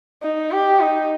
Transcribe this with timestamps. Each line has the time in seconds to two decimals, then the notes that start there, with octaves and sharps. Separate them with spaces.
0.23 D#4
0.51 G4
0.80 D#4